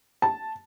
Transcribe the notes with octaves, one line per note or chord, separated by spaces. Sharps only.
A5